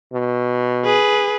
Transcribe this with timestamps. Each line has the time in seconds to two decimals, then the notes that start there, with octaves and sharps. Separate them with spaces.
0.13 B2
0.85 G#4 B4